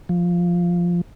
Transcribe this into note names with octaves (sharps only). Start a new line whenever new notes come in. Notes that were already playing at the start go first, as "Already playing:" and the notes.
F3